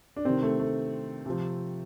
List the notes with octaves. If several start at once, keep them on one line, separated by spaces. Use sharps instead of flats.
D4
C3 D#3 C4
A3
A3
C3 F3